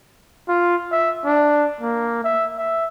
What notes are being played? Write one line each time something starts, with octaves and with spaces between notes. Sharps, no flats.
F4
E5
D4
A#3
E5
E5